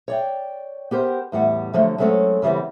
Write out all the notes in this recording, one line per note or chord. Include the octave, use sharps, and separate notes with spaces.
C#5 D5 G5
B3 G4 A#4 C5
E2 A2 G3 F#5
D3 F3 F#3 A3
F#3 G#3 A3 C4 C#4 A4
C#3 E3 G3 B3 C4